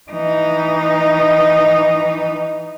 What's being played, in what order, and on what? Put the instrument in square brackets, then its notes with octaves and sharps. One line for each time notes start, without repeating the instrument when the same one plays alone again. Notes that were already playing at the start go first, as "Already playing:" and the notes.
[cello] E3 D#4